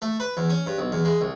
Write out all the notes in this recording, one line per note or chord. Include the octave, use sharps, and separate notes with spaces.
A3
B4
E2
C#4
G2
B1
E2
G#3
C2